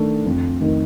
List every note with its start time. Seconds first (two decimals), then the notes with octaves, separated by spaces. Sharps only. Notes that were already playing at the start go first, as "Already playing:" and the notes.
Already playing: D#3 A3 D4 A4
0.26 F2
0.61 D#3 A3 D#4 A#4